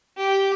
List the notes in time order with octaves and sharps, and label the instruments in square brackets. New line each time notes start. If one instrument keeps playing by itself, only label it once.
[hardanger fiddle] G4